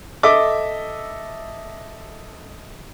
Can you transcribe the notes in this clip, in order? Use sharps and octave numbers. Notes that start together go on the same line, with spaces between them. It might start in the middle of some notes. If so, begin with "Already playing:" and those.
A4 D#5 E5 D6